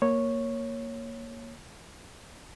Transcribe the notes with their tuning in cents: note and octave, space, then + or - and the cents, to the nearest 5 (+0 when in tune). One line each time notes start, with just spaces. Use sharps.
A#3 +0 C#5 -5